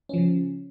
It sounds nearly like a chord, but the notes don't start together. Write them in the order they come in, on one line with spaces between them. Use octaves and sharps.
C#4 F3 C#3